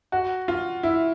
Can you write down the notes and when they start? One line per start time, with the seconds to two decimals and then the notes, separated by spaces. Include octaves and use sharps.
0.12 F#4
0.48 F4
0.83 E4